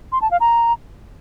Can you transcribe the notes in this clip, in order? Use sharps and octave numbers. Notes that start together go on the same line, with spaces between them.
C6
A5
F5
A#5